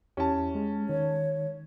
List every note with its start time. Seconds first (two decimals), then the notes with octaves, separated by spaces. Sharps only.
0.17 E2 C#4 E4 G4 A5
0.55 G#3
0.89 D#3 C#5